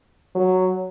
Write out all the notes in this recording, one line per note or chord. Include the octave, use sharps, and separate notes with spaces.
F#3